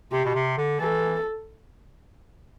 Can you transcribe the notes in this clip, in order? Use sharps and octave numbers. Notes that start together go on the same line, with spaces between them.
C3 G4
B2
C3
D3
E3 A4